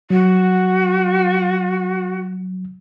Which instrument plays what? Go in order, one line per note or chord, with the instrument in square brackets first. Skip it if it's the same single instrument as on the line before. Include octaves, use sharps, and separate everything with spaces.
[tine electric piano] F#3 [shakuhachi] F#4